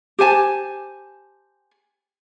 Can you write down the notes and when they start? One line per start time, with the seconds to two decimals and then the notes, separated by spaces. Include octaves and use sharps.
0.19 G4 C5 G#5 A5